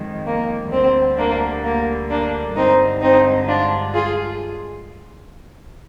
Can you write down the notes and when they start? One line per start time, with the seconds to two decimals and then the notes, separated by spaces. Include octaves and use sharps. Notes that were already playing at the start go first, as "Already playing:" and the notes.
Already playing: F2 D#3 G#3
0.26 A#3
0.72 D2 D3 G3 C4
1.18 A#3 D4
1.64 A#3
2.10 A#3 D4
2.56 G2 D3 G#3 C4 D#4
3.02 C4 D#4
3.48 D4 F4
3.94 F4 G#4